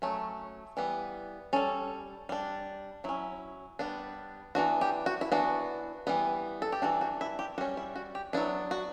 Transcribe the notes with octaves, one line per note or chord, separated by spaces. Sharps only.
F#3 A3 C#4
E3 G3 B3
G3 C#4 A4
G3 D4
F#3 C#4 E4
G3 B3 D4
E3 B3 D4 F#4
G4
F#4
E4
E3 B3 D4 F#4
E3 G3 B3
A4
G4
E3 G3 D4 F#4
F#4
E4
G4
G3 C#4 F#4
E4
F#4
G4
F#3 B3 D4 E4
F#4